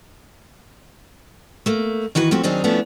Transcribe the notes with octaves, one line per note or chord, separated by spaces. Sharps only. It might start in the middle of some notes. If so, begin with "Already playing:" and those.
A3 A#3
D#3 E3 F#4 B4
F3 A3 C4 F#4
D#3 F#3 C4 D4 D#4 G#4
F3 A3 B3 C#4 D4 E4